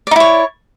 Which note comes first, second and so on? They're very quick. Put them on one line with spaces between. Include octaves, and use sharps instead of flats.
D5 D#4 E4 C#5